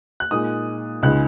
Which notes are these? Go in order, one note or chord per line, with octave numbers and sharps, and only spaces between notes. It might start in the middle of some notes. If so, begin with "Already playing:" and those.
F#6
A#2 G#3 D#4 D#6
C#2 C#3 G#3 D#4 F#6